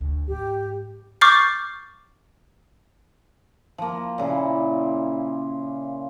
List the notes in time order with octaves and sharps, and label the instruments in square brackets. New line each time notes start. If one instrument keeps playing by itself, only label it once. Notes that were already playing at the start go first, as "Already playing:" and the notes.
[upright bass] D2
[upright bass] G#2 [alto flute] G4
[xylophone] C#6 D6 F6 G6 A6 C7
[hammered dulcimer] F3 A#3
A#2 C#3 E4